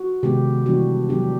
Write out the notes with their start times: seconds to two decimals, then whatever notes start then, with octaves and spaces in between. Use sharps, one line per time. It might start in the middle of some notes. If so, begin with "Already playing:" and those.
Already playing: F#4
0.23 C3 D#3 G#3 B3 G4
0.66 E3 G3 B3 D4 F#4
1.09 D#3 F#3 B3 D4 G4